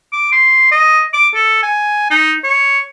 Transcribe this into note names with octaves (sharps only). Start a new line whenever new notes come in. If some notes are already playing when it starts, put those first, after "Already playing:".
D6
C6
D#5
D6
A4
G#5
D#4
C#5